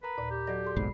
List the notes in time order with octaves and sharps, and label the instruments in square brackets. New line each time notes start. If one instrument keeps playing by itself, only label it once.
[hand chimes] A#4 A#5 B5 [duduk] B4
[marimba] D#2 A#2 D5
[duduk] G4
[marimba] F#3 D#5 A#6 [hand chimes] F#4 A4 D5
[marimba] G#4 C6
[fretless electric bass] F#1 B1 G#2 [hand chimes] B5 C7